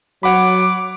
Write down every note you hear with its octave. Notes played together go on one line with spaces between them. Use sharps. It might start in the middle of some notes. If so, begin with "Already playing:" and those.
F#3 C#5 F#5 B5 D6